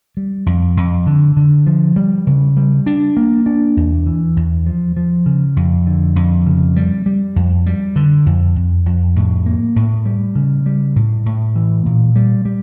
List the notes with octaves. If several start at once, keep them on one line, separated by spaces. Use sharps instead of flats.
G3
F2
F2
D3
D3
F3
G3
C#3
G3
D4
A#3
D4
E2
E3
E2
F3
F3
C#3
F2
D3
F2
C#3
G3
G3
F2
G3
D3
F2
F2
F2
A2
A#3
A2
G3
C#3
G3
A2
A2
E3
A#2
G3
G3